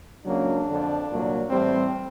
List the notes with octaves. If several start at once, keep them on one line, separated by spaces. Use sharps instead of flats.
C#2 C#3 F#3 A#3 D4
F2 D3 F3
C2 A#2 F#3 A#3
A2 E3 G3 C4